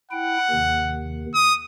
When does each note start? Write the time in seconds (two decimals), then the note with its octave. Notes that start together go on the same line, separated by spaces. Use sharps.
0.11 E4 F#5 G5
0.51 D#2 C3 D#3
1.34 D#6